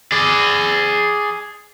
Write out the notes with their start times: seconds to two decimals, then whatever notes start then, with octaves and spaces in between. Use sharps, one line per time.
0.12 G#4 D5